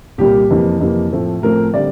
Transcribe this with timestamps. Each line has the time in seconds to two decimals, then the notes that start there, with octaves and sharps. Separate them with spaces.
0.18 C2 A#2 G3 A#3 G4
0.50 F2 C3 E3 A#3
0.80 F2 C3 E3 A#3
1.12 A2 F3 A3 C4
1.42 A2 F3 A3 C4 A#4
1.73 D3 G3 C4 D5